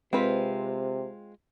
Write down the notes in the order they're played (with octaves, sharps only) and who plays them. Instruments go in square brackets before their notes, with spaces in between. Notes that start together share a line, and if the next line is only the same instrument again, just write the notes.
[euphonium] C3 [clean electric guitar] G#3 F4 [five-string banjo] C4 B4